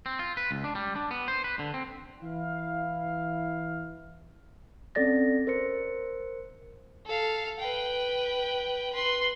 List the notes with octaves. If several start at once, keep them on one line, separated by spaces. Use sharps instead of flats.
C4
F4
B4
C#2
D4
G3
D4
B3
C5
B4
D3
C4
E3 E4 F5
C4 C#4 A4 D5 A6 A#6
A#4 C5 C#7
A4 F5
B4 G5
B4 C6